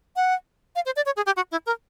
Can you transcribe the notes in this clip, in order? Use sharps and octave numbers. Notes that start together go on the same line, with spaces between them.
F#5
F5
C5
D5
C#5
G#4
G4
F#4
E4
A#4